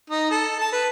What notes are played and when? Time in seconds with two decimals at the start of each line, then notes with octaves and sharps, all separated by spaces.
0.10 D#4
0.31 A4
0.59 A5
0.72 B4